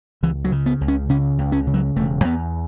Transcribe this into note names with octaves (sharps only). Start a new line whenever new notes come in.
C#2 E3
F#3
C#3
B3
C#2
C#4
C#3 C#4
C#2
C#4
C#3
F#3
E1 A3
E2 B3